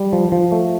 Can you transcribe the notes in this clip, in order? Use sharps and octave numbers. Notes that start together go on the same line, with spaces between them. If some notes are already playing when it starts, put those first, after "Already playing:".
Already playing: G3
F3
F3
A3